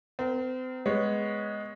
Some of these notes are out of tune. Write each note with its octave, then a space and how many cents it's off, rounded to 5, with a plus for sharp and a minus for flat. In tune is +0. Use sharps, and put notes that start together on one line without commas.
C4 -35 A#4 +0
G#3 +0 B3 +0 C#5 +0